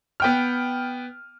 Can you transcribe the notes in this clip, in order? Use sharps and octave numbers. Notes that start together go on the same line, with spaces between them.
B3 G5 F6